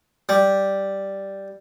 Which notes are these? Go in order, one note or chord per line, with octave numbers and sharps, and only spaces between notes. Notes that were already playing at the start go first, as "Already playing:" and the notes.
G3